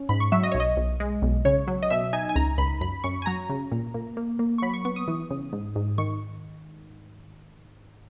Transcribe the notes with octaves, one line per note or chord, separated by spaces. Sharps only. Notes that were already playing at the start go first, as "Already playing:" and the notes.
Already playing: C#4
G#2 B5
C#6
F#3 E5
D#5
B1 C#5
D#5
B1
G#3
B1
C#3 C#5
F#3
D#5
B2 E5
D#4 G#5
G#5
C#2 A#5
C#2 B5
F#2 B5
F#2 C#6
G#5
F#3 A#5
C#3
A#2
A#2
A#3
A#3
C#6
F#3 B5
C#6
B3 C#6
D#6
E3
C#3
G#2
G#2
D#3 C#6